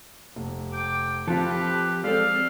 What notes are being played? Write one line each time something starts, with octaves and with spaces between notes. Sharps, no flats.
F1
G5 D6
F3 C4 F4 G4 A4 B4
G#3 C4 A4 D5 F5